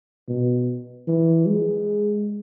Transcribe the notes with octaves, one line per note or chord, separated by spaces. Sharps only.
B2
E3
G#3